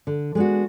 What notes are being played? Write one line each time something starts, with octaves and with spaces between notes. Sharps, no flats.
D3
G#3 B3 D4 F#4